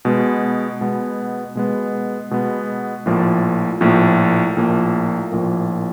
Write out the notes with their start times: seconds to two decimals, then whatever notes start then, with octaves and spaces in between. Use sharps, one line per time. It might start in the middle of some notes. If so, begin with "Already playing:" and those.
0.05 B2 G#3 B3
0.81 B2 G#3 B3
1.55 B2 G#3 B3
2.31 B2 G#3 B3
3.06 A#1 A2 F3 A#3
3.81 A#1 A2 F3 A#3
4.56 A#1 A2 F3 A#3
5.32 A#1 A2 F3 A#3